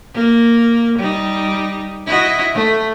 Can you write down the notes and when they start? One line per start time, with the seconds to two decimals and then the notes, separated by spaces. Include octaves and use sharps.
0.14 A#3
0.99 G3 D#4
2.06 E4 F#4 D#5
2.54 A3